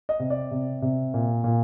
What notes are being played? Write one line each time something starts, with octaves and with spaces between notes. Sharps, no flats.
D#5
C3
D5
C3
C3
A#2
A#2